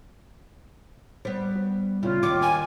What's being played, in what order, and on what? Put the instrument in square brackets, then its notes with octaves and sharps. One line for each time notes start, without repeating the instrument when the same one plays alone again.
[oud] G3 B3 [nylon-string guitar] C5
[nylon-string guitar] F#4
[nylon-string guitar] C#3 E4 [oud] G3 [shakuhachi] F4
[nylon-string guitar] D#2 D#3 F#4 [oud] C#5 [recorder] D6
[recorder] G#5